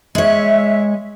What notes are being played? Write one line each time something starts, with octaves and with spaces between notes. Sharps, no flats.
G#3 C#5 E5